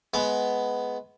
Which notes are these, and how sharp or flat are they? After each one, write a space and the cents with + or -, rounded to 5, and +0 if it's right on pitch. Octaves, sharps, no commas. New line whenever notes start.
G#3 +20 B3 +10